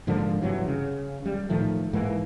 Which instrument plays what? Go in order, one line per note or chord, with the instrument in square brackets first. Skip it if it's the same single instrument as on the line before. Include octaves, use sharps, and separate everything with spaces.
[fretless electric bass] G#2 D3 F3 A#3
G2 C3 E3 F#3
C#3
G3
A2 D#3 F3 A3
G#2 E3 A#3